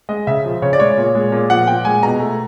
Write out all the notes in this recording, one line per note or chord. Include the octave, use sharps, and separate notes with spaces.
G#3 D#5
C#3 E5
F3
C#3 C#5
D5
G#3 C#5
A#2
G#3
A#2
F3 F#5
A#2 G5
G#3 G#5
B2 A#5
A3